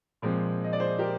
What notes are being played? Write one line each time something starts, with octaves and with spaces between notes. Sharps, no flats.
A#2 F3 G#3 C4
D#5
D5
G#4 C5
G4 A#4